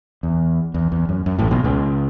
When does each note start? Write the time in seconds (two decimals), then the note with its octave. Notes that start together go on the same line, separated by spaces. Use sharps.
0.23 E2
0.74 E2
0.92 E2
1.09 F#2
1.26 F#2
1.38 A1 A2
1.51 B1 B2
1.64 C#2 C#3